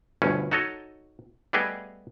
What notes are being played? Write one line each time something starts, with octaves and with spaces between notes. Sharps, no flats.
G1 D2 G2 B2 C#4
D#4 F#4 A4 C#5 D#5
G3 A3 B3 G4 G#4 D#5